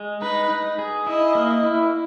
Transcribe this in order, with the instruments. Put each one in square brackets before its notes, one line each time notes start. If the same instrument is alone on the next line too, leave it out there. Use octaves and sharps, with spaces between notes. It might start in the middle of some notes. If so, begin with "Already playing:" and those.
Already playing: [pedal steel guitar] G#3
[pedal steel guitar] D#4 [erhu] B4
[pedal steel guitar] D#4
G#4
[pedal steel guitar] E4 [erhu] D#5
[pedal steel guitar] A#3
E4